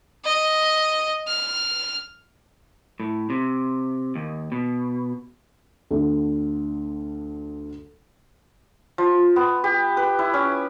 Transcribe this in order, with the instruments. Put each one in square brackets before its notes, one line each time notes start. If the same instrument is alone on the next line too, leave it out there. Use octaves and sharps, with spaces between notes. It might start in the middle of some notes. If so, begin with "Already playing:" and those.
[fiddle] D#5
F6
[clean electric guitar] A2
C3
D#2
B2
[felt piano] D2 D3
[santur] F3
B3
G4
B4
E4
C#4